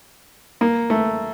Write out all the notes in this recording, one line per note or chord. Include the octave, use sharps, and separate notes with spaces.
A#3
A3